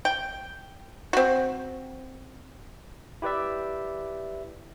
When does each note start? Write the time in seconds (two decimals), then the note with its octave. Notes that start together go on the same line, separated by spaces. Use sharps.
0.05 G5
1.13 C4 F#4
3.22 E4 G4 B4 D5 E5